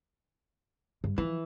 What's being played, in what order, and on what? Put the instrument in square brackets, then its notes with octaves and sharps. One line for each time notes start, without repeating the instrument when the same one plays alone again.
[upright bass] G2
[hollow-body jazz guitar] E3 [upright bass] F3